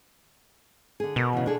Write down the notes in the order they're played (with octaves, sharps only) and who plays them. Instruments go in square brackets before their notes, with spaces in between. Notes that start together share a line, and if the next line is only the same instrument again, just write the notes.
[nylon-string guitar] D3 G#4
[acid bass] B2 [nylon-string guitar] A#4
[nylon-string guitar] C#3 E3
D4 G#4 A4